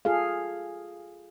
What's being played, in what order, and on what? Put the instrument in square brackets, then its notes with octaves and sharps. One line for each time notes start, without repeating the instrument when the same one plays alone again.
[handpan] F4 G#4 A4 F5